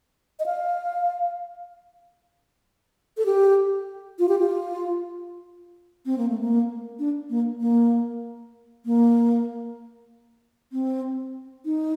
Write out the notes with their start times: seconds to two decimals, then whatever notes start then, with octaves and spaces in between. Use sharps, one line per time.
0.40 D#5
0.46 F5
3.17 A4
3.26 G4
4.19 F4
4.29 G4
4.38 F4
6.06 C4
6.18 A#3
6.29 A3
6.41 A#3
6.99 D4
7.30 A#3
7.61 A#3
8.86 A#3
10.72 C4
11.65 D#4